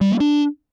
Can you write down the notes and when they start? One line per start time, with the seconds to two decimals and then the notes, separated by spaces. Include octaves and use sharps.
0.01 G3
0.11 A#3
0.20 D4